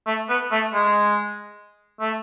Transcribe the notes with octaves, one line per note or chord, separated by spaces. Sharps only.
A3
B3
A3
G#3
A3